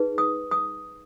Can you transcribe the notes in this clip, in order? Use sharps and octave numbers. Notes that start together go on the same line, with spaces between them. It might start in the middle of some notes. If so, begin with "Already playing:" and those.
Already playing: D#4 G#4 B4
D#6
D#6